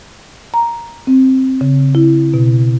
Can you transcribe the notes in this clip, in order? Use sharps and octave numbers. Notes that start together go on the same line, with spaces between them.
A#5
C4
C#3
E4
B2